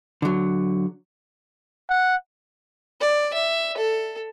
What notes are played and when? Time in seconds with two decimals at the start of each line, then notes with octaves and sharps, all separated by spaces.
0.22 D3 F#3
1.89 F#5
3.01 D5
3.34 E5
3.77 A4